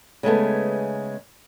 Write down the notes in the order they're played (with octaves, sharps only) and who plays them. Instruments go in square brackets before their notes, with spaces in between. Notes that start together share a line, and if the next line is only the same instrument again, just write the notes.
[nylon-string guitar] C#3 G#3 A3 B3